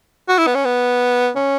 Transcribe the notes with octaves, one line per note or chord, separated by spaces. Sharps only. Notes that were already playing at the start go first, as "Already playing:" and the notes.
F#4
E4
B3
C#4
B3
C#4